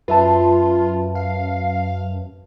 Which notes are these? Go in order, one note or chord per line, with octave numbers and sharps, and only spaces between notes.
F#2 F4 B4 E5 A5
F5